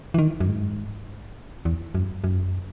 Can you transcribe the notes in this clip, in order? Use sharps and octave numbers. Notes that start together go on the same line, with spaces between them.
E3
D#3
F#2
G#2
E2
F#2
F#2